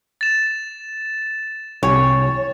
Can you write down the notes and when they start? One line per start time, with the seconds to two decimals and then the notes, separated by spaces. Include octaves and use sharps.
0.21 A6 E7
1.83 C2 G4 C#5 G#5